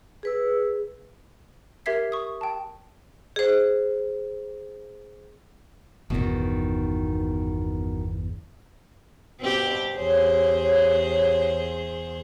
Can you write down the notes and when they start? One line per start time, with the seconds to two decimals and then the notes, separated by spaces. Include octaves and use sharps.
0.23 G#4 B4 E6
1.86 G4 A#4 E5 G#6 B6 C7
2.12 C#6 D#6
2.41 G5 A5
3.36 G#4 C5
6.10 G1 E2 B2 D#3
9.41 G2 B2 C4 G4
9.98 E2 G4 G#4 C5 C#5